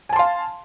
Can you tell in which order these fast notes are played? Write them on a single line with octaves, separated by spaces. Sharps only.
G#5 A5 C6 F5